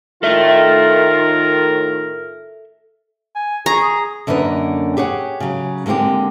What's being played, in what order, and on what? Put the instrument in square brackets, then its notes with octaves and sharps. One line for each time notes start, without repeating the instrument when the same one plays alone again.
[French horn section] A2 D#3 F4 [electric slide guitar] A4 E5 [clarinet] A#4
[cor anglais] G#5
[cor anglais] G#4 [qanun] A#5 [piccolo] C#6
[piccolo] D#6
[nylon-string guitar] F#2 D3 A#3 C#4 B4 D#5
G4 G#4 C#5 F#5
C#3 F#3
D3 G#3 A#3 C4 G4